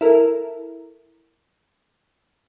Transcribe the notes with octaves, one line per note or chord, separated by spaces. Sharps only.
E4 A4 A#4